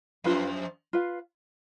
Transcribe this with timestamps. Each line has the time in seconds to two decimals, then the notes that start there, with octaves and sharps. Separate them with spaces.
0.24 F2 F3 F4 B4 F5
0.93 F4 B4 F5